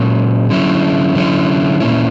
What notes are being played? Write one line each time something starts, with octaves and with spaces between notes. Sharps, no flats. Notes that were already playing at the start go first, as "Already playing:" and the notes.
Already playing: A#2 F#3 C#4
D3 F#3 C#4 E4
D3 F#3 C#4 E4
A#2 A#3 C#4 E4